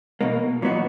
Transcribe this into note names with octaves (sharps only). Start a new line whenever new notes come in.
B1 B2 A#3 D#4
A#2 F#3 B3 D#4 F#4